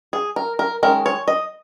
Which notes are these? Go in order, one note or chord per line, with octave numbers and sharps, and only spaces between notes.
G#4
A#4
A#4
D#3 G#3 C#4 A#4
C#5
D#5